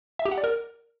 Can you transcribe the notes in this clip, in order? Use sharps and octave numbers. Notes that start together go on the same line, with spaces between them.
E5
G4
F#5
D5
A#4